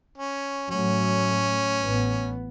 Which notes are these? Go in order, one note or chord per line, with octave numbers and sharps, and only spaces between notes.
C#4
A2 F#3 A3 C#4
A1 B3